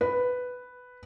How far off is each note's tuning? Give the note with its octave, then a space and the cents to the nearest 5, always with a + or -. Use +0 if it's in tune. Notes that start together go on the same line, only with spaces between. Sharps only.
B4 +5